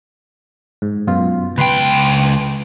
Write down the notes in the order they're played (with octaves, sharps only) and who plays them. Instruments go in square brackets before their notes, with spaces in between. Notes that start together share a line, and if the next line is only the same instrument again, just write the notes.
[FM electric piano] G#2
F#2 B2 F4
[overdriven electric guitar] C#2 G5 [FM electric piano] B4 C6